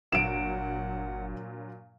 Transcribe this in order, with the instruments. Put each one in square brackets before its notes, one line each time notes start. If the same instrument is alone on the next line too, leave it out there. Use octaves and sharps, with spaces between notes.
[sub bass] G1 [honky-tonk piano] G2 A#2 F#3 [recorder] F#5 [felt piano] D7 E7